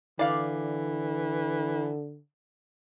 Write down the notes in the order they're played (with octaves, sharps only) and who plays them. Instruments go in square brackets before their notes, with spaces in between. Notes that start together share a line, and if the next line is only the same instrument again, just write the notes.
[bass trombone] D3 [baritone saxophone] E3 [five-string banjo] D5 F5